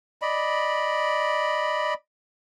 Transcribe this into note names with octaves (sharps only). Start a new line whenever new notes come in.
D5 D#5 B5